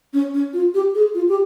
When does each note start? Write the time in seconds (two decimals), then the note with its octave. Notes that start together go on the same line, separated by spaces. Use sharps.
0.13 C#4
0.34 C#4
0.53 F4
0.74 G4
0.95 G#4
1.14 F4
1.29 G4